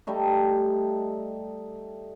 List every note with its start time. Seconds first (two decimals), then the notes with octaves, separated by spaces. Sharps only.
0.07 G3 A3 D#4